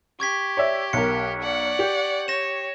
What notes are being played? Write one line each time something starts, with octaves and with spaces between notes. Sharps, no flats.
G4 C#6 G#6 B6
C#5 D5 E5
B1 A#4 C#7
D5 F#5
G4
C#5 A#6 E7